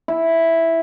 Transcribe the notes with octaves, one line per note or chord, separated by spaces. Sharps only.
E4